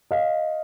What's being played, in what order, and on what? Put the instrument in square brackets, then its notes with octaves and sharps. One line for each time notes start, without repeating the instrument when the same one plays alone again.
[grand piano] D#5 F5